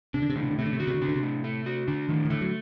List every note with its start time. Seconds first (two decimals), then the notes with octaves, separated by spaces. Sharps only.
0.14 C3 D4
0.22 D3
0.30 C3
0.36 A2 D3
0.43 C3
0.51 D3
0.58 C3 A3
0.66 D3
0.73 C3
0.80 D3 F#4
0.87 C3
0.94 D3
1.02 C3 D4
1.09 D3
1.15 C3
1.22 A2
1.44 A3
1.66 F#4
1.87 D3 D4
2.09 A2 D#3
2.25 D#3
2.30 D3 A3
2.41 F#3